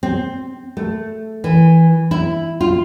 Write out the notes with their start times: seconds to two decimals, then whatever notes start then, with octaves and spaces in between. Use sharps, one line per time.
0.03 C4
0.77 A3
1.44 E3
2.11 E4
2.61 F4